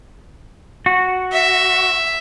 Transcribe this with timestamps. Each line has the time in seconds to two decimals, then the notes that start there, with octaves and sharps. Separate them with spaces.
0.86 F#4
1.32 E5